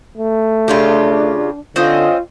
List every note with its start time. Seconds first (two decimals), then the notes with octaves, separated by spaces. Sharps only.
0.18 A3
0.68 C#3 D4 F4 G4
1.76 D3 C4 C#4 F4 D#5